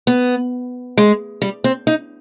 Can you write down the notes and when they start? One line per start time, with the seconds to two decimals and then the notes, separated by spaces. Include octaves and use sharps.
0.07 B3
0.97 G#3
1.42 G3
1.64 C4
1.87 D#4